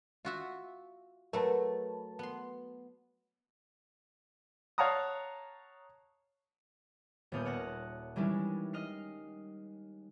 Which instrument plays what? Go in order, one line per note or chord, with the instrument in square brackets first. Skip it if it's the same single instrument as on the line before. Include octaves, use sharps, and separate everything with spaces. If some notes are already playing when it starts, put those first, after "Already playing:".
[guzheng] F4 F#4 E5
[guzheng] F#3 A3 [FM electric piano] A#4 B4 A5
[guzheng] B3 C6
[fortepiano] C#5 F5 F#5 A5 A#5 D#6
[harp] D#1 A#2 B3 F5 D#6 G6
C#5 F#5 A5 F6 F#6 A#6
D#3 E3 G3 G#3 C#4 D4
D#5 F6 C7